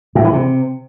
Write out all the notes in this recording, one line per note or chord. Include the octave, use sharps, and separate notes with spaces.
A2
E3
C3